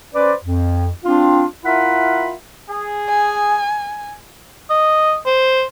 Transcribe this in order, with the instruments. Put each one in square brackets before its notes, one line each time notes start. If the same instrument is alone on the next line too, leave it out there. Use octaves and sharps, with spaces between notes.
[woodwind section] C#4 B4 C5 D5
F2
C4 D4 F4
E4 F4 A#4 E5 F#5 B5
[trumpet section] G#4
[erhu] G#5
[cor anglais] D#5
C5